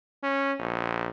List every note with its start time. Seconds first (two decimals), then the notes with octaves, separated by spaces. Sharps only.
0.23 C#4
0.59 A#1